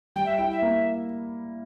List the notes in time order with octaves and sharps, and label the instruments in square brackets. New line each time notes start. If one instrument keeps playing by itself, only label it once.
[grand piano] G3 [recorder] G5
[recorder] E5
[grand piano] E4 [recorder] G5
[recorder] E5
[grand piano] A#3